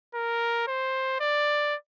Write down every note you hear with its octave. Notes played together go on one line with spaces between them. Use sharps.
A#4
C5
D5